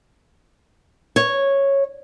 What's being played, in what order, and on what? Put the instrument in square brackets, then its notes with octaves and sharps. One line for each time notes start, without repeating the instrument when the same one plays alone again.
[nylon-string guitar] C#5